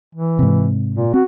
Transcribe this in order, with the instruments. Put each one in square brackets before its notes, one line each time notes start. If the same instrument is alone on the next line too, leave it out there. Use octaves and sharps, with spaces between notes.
[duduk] E3
[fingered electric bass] G#2 C3
[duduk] A#2
[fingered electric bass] C4 [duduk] F#4